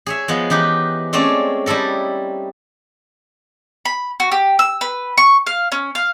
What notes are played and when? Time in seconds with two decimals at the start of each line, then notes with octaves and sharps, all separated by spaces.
0.06 G#4 C#5 E5
0.28 F3 G#3 B3
0.50 E3 D#4 G4 B4
1.13 G#3 A3 C4 C#4 F4 D5
1.66 G3 D#4 E4 A4 A#4
3.85 B5
4.20 F#4
4.32 G4
4.59 E6
4.81 B4
5.18 C#6
5.46 F5
5.72 C#4
5.95 F5